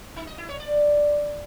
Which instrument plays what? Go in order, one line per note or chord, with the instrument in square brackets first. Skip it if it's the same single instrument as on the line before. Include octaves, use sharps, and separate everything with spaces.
[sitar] D#4
D#5
E4
C#5
D5